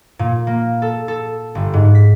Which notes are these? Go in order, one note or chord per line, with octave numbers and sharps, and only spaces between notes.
A#2
A#3
A4
A4
G1
G#2
B6